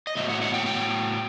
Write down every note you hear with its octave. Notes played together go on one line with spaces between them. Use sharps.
D#5
A2 F#3 B3 E5
F#5
F#5
G5
G5